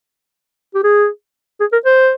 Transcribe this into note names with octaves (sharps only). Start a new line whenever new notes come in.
G4
G#4
G#4
A#4
C5